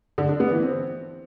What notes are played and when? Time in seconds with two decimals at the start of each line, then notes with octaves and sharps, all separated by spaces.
0.18 D3
0.29 D4
0.40 B3
0.51 E3
0.62 C4